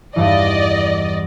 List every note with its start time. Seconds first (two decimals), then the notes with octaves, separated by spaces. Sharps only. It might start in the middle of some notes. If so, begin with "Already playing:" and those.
0.16 E2 G2 E3 D5 D#5